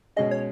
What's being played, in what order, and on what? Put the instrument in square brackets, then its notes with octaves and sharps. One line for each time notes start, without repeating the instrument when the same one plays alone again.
[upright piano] B2 G#3 C#4 G#4 [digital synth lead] D#5
[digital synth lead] C#5